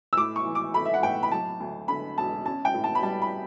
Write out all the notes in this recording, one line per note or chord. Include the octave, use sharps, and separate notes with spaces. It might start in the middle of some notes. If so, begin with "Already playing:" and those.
E6
A2 D6
C#6
E3
D6
A3 B5
E5
F#5
A2 G5
B5
F#3 A5
D2
D3 B5
E1 A5
C#4 A5
G5
A2
A5
B5
G3 A5
B5